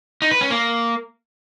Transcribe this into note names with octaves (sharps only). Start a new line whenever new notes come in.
D#4
B4
C#4
A#3